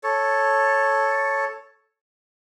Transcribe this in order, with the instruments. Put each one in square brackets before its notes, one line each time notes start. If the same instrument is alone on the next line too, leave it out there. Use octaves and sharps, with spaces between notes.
[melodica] A4 C#5